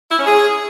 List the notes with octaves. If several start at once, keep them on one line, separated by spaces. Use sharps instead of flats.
E4
C#4
G#4